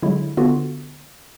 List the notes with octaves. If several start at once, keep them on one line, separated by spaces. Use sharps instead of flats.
D3 F#3 G#3 E4
D3 B3 F4 F#4